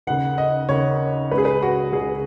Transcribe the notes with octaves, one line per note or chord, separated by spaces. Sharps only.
D#2 C#3 F#5
D#5
D#2 C#3 C#5
C#2 C#3 B4
G#4
B4
F#4
C#2 C#3 G#4